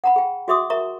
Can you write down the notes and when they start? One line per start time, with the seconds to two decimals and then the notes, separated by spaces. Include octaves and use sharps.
0.04 F#5 A#5 B5
0.16 G#4 G5
0.48 F#4 G#4 E5 C6 D6 D#6
0.70 A#4 E5 A#5 C#6